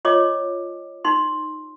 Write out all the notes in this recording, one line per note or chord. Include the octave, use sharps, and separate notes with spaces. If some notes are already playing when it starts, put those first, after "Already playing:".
F4 C#5 D#5 D6
D#4 C6